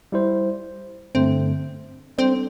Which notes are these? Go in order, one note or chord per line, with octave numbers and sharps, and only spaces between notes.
G3 E4 C5
G2 D3 A3 C4
G3 C4 D4 A4 D5